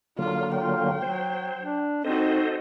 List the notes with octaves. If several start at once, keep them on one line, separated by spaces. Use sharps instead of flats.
D3 F#3 A#3 F4
F4 G5
F#3 C5
D4
C4 D#4 F#4 A4 C5 D#5